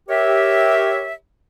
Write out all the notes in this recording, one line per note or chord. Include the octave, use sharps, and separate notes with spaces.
G4 A#4 C#5 E5